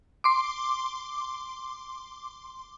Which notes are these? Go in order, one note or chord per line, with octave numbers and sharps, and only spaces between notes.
C6 D6